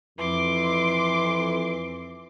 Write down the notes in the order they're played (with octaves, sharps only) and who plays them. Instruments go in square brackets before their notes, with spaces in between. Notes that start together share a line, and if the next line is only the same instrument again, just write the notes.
[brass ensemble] F2 [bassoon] E3 [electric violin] C6 D6